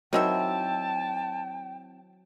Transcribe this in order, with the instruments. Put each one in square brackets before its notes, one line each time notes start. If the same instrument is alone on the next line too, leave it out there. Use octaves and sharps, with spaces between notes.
[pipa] D#3 D#4 E5 [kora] F#3 C4 E4 [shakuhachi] G5 [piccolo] A5